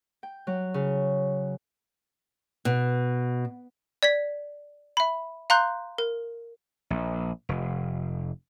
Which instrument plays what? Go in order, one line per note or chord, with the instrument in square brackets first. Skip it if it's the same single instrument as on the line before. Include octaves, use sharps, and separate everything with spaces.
[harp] G5
F#3
C#3
[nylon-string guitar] B2
[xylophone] D5 G#6 B6
E5 B5
F5 A#5 C6 F#6 G6
A#4
[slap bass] A#1
F1